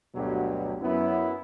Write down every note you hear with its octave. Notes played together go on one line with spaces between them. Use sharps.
D2 G2 B2 D3 F#3 G4
F#2 B3 E4